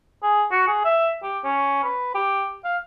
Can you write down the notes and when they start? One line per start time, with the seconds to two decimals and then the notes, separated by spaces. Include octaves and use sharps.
0.23 G#4
0.51 F#4
0.67 G#4
0.85 E5
1.23 G4
1.44 C#4
1.84 B4
2.15 G4
2.64 F5